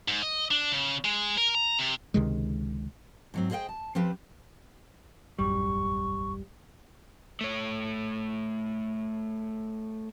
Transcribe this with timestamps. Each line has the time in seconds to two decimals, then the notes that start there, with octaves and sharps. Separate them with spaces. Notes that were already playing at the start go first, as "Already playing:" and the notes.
0.08 G#2
0.23 D#5
0.51 D4
0.72 C#3
1.05 G#3
1.38 A#4
1.55 A#5
1.79 C3
2.14 C#2 C3 D#3 G#3
3.34 G#2 F#3 C4
3.51 G#4 C5 D#5 F5 G5
3.69 A5
3.95 F3 C4 G4 B4 C5
5.39 E1 A1 F#2 G3 C#6
7.41 A3 C#5